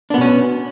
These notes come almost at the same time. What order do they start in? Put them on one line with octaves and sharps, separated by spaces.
D4 B3 B2 C#4